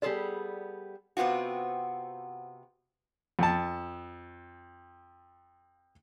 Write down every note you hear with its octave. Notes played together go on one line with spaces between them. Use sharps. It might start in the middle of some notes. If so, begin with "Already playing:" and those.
G3 B3 G#4 A4 D5
C3 B3 C4 F4 F#4
F2 A5